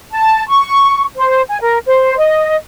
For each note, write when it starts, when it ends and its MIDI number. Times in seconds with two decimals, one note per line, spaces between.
0.12 0.46 81
0.47 1.03 85
1.16 1.41 72
1.49 1.57 80
1.61 1.78 70
1.86 2.15 72
2.18 2.56 75